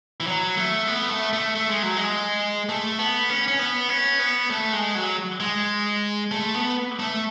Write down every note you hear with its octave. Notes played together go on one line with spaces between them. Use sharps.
E3
F#3
A3
B3
A3
A3
A3
G#3
F#3
G#3
A3
B3
C#4
C#4
B3
C#4
B3
A3
G#3
F#3
G#3
A3
B3
A3